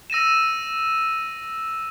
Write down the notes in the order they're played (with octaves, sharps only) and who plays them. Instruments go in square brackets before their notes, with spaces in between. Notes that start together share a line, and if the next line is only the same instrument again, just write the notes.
[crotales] E6 A#6 D#7 E7